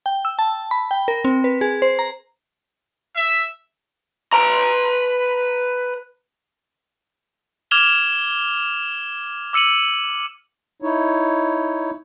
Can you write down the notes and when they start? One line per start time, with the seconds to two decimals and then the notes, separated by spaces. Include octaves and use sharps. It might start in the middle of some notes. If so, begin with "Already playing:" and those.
0.06 G5
0.25 E6
0.39 A5
0.71 B5
0.91 G5
1.08 A#4
1.25 C4
1.44 B4
1.61 G#4
1.82 C5
1.99 A#5
3.15 E5
4.33 B4 A#5
7.71 D6 F6 G#6 E7 F7 G7
9.53 D6 E6 C#7 D#7 F#7
10.82 D#4 E4 C#5